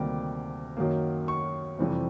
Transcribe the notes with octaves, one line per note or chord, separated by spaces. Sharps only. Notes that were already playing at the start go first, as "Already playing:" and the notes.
Already playing: D2 C3 D#3 G3 A#3 D6
F#2 D#3 F#3 A#3
C#6
F2 C3 E3 G3 C4